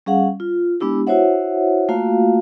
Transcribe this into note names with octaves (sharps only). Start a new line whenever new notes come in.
G3 C#4 G#4 F5 F#5
F4
G#3 B3 D4 E4 G4
E4 F#4 C5 C#5 E5 F#5
A3 A#3 F4 F#4 F5